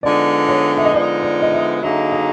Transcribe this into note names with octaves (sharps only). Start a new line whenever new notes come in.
D3 F3 G#3 B3 D#4 D5
C#5
E5
D#5
D3 F3 G#3 B3 D#4 D5
D5
D#5
E5
D3 F#3 A#3 D#4 G#4 E5
D#5